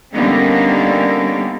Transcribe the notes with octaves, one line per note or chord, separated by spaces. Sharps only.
D3 D#3 G3 A#3 B3 C#4